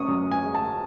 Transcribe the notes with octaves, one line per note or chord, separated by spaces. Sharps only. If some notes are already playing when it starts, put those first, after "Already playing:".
Already playing: C#4 C#6 D#6
F#2
G#5
G#3
A5